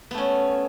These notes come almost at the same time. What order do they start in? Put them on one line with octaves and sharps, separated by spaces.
B3 A3 C#4